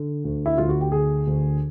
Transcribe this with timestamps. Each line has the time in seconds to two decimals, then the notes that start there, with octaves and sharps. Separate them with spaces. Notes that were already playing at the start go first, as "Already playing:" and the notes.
Already playing: D3
0.24 D2
0.46 E4
0.58 D2 F4
0.69 F#4
0.81 G4
0.92 D3 G#4
1.27 D2